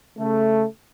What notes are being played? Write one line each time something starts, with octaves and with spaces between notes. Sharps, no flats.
C#3 A3